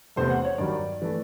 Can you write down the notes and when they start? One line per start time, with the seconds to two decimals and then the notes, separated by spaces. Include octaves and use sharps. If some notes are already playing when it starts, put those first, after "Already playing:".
0.16 E2 C3 E3 A3 C5
0.30 F#5
0.45 C#5
0.58 G2 D#3 F#3 D5
1.02 E3 A3